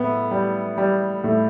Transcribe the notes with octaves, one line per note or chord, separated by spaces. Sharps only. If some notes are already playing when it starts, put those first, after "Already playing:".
Already playing: A2 B3
G3
G3
A2